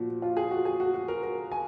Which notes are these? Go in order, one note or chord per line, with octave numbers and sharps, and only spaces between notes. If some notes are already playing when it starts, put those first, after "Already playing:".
Already playing: A#2 F3 F#4
F4
G#4
F#4
G#4
F#4
F#4
A#4
A#4
G#5